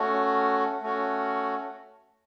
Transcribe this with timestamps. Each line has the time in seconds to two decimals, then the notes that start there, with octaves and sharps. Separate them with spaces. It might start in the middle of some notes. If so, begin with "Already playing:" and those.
Already playing: A3 C#4 F#4
0.82 A3 C#4 F#4